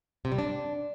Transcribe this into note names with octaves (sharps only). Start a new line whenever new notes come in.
C3
G3
D4